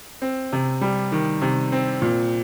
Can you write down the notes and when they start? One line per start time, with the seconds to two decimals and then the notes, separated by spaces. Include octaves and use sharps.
0.22 C4
0.52 C3
0.81 G3
1.12 D#3
1.42 C3
1.72 C4
2.02 A#2